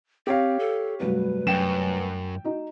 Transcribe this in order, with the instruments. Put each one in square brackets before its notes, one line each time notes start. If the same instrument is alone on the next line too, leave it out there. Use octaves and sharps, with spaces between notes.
[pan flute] C4 [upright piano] G4 C#5 F5
[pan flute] A4
[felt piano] F1 G2 F#3 [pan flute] B4
[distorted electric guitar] F#2 [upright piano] G5 E7
[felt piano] D#4 F#4